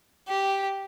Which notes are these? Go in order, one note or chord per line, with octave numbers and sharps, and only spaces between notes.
G4